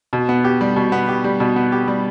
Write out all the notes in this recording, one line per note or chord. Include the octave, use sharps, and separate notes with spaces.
B2
B3
G4
G3
B2
B3
G4
G3
B2
B3
G4
G3